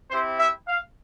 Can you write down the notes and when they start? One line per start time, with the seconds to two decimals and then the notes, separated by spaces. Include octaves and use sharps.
0.11 C4 E4 G4 C5
0.39 E5
0.68 F5